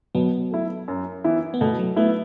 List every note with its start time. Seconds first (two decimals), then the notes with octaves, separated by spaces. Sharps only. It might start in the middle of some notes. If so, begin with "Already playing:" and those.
0.15 B2 F#3 B3
0.51 A3 E4
0.88 F#2
1.24 E3 B3 E4
1.54 B3
1.61 B2 A3
1.79 F#3
1.96 A3 B3 E4